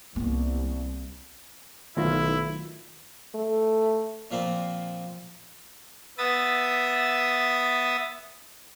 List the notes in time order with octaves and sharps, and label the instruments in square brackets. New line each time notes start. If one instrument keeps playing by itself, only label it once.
[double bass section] C2 [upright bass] A#3 B3
[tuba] B1 [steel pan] D#3 A3 F4 [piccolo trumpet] E4
[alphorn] A3
[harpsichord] A#2 F3 A#3 C4
[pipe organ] B3 E5 D#6 A6